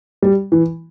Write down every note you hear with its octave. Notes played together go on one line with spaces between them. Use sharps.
G3
E3